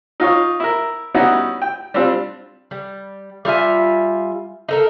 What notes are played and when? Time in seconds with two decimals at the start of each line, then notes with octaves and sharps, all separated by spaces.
0.20 D#4 F4 C#5
0.60 E4 A#4
1.14 G3 B3 C#4 D#4 E4 F#4
1.62 G5
1.94 G3 C4 D4 F4
2.71 G3
3.45 G3 F4 E5 G#5
4.69 D#4 A4 A#4